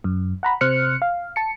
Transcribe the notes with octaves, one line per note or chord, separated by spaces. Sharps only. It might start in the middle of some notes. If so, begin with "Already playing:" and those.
F#2
F#5 A#5 B5
C3 C5 F6 F#6 C#7
F5
A5 C#7